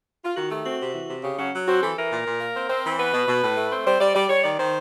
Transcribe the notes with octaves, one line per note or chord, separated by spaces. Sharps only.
F4
D#3 F#4
A3 G4
C4 F#4
C3
E3
C3
C#3 G4
F#3 C#4
F#3
C4 F#4
E3 A4
E3 A#4
A#2
A#2
A#3
C4
C4
E3
B3 B4
B2
B2
A2
A3
C4
G3 C5
G3 D5
G3 D5
G3 C#5
D#3 D5
D#3 C5